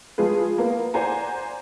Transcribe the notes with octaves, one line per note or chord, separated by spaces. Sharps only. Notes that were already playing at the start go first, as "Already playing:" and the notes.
F3 G#3 F4 G#4 B4
A#3 B3
C5 D5 F#5 G#5 A#5